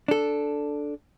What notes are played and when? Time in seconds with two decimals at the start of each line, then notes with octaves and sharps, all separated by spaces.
0.08 D4 A4